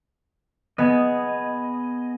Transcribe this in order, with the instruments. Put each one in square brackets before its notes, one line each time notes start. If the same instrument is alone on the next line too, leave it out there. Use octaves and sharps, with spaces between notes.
[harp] B3 [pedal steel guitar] G#4 D#5